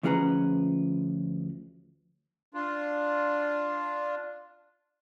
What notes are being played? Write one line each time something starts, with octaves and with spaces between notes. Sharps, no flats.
D2 F3 C#4 G#4 B4 A#5
D4 F4